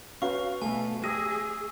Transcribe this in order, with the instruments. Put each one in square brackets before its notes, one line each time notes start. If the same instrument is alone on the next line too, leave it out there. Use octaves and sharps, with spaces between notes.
[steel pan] C#4 F#4 B4 [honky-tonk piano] F5 [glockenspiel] C#6
[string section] B2 [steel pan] A3 A4 [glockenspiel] G#5
[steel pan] G4 [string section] G#4 [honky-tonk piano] D#6 A#6 D#7 [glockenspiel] E6